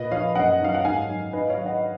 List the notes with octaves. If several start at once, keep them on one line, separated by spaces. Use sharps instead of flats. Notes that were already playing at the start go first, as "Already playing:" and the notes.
Already playing: A#2 B4 D#5
F3 C#5 F5
F#2 D#5 F#5
D#3 F#3 F5
F#5
G#2 F5 G#5
D#3 F#3
G#2 B4 D#5
C#5 F5
D#3 F#3
D#5 F#5